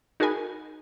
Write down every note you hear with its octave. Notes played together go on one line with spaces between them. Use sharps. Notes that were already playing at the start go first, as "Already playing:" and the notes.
D#4 F#4 G#4 A#4 G#5 B5